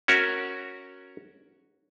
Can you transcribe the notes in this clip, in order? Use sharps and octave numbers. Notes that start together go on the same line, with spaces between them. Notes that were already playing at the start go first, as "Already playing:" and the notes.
C#4 F#4 A#4 E5